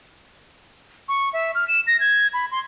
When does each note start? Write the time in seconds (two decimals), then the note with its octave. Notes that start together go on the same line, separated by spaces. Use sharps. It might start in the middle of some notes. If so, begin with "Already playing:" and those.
1.08 C#6
1.33 E5
1.55 F6
1.68 E7
1.87 A#6
2.00 G#6
2.34 B5
2.52 C6